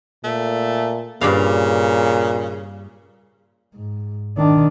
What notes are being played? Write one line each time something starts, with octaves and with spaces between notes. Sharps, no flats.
A#2 A3
G2 A#2 C#3 D5 F5
G#2
D#3 D4